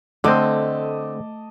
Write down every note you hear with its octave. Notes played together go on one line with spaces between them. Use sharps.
D3 A3 C4 D#5 A5 D6